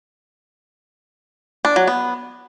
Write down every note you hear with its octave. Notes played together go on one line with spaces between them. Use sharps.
D4
F#3
B3